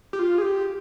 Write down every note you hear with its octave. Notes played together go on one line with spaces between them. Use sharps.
G4
F4
G#4
G4